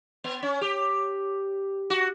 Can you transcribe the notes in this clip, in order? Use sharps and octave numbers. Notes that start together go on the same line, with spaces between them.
B3
C#4
G4
F#4